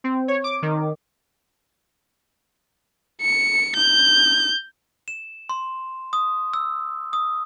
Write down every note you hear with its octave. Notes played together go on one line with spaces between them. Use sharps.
C4
C#5
D6
D#3
C#7
G6
E7
C6
D#6
E6
D#6